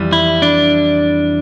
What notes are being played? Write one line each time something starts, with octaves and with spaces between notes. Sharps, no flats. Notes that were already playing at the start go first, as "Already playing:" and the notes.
Already playing: F2 E3 G3
E4
D4